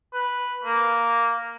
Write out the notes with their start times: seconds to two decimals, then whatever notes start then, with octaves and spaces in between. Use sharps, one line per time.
0.13 B4
0.64 A#3